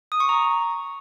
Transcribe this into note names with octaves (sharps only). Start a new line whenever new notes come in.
D#6
C#6
A#5